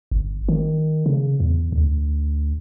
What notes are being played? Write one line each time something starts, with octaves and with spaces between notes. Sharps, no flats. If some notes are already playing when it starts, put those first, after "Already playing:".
G1
D#3
C#3
E2
D2